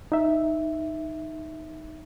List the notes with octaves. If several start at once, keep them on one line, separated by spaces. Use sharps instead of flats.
D#4 E5